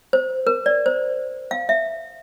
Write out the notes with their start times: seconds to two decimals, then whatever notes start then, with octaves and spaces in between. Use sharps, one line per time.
0.13 C5
0.47 A#4
0.66 D5
0.86 C5
1.51 F5
1.69 E5